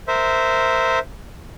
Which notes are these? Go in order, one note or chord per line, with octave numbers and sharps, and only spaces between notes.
A#4 C5 E5